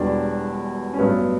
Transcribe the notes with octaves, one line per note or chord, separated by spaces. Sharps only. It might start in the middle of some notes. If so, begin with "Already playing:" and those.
Already playing: E1 E2 B2 G3 D4
C#4
A1 G2 F#3 B3